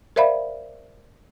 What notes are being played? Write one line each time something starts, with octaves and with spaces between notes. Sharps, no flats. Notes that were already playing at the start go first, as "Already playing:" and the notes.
A#4 C5 D5 E5 F5 B5